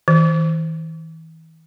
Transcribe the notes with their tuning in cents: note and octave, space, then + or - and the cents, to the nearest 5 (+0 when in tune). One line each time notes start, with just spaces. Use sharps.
E3 -40